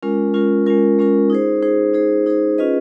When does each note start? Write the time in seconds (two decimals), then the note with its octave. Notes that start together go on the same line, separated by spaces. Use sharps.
0.03 G#3 C#4 F4 A#4
0.34 G#3 C#4 F4 A#4
0.66 G#3 C#4 F4 A#4
0.99 G#3 C#4 F4 A#4
1.30 D#4 G#4 C5
1.63 D#4 G#4 C5
1.93 D#4 G#4 C5
2.26 D#4 G#4 C5
2.58 C#4 F4 G#4 B4 D#5